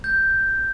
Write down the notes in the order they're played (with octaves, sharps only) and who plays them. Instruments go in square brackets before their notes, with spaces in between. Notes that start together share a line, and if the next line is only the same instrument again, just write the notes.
[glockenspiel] G6